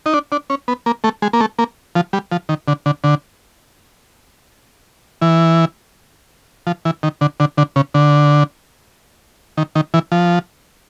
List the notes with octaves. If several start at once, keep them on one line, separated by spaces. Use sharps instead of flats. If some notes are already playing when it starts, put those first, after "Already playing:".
D#4
D4
D4
C#4
B3
A#3
A3
G#3
A#3
A3
A#3
F3
G3
F3
D#3
D3
D3
D3
E3
F3
E3
D#3
D3
D3
D3
C#3
D3
D#3
D#3
E3
F3